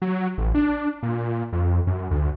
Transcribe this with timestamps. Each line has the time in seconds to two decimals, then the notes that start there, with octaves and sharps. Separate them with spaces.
0.02 F#3
0.38 A1
0.54 D4
1.03 A#2
1.53 F2
1.87 F#2
2.11 D2